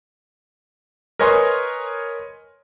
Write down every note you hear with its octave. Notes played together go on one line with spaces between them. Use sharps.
A#4 B4 C#5 D#5 G#5 C6